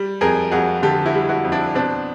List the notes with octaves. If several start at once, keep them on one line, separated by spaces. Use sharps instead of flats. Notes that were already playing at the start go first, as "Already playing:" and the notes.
Already playing: G3
F2 G#4 A#4
F2 F#4 G#4
D3 G4 A4
E4 F#4
G3
E4 F#4
F2
D4 E4
B2 C4 D4